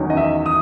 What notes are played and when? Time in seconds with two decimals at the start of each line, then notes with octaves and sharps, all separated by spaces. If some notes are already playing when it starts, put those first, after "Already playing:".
Already playing: E2 D#3 F#3 C#4
0.10 D#5
0.17 E5
0.46 D#6